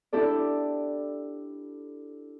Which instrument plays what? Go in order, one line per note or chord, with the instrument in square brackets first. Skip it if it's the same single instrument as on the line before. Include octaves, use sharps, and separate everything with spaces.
[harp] D4 E4 G4 A4 D5